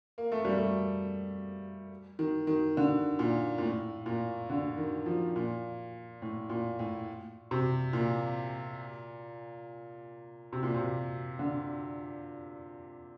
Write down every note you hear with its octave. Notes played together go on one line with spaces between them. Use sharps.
A#3
A3
G3
A3
D#3
D#3
D3
A#2
A#2
A2
A#2
D3
D#3
F3
A#2
A2
A#2
A2
C3
A#2
C3
A#2
C3
D3